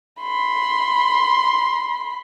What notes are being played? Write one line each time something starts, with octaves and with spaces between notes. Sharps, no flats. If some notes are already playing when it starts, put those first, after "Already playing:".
B5 C6